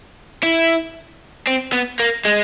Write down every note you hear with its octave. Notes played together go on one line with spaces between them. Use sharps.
E4
C4
B3
A#3
G#3